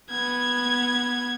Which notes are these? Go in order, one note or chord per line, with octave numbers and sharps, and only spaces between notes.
B3 G#6